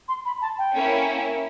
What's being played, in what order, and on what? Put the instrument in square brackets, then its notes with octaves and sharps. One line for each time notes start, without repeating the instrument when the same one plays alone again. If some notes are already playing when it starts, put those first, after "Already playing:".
[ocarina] C6
B5
A5
G5
[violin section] A#3 C#4 E4